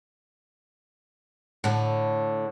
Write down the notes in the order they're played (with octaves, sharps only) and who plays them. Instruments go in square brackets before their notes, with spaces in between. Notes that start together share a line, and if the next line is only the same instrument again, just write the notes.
[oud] A2 D3